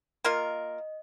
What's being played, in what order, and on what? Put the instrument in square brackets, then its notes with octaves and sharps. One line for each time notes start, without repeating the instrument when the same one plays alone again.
[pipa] A#3 F4 A#4 [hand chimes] D#5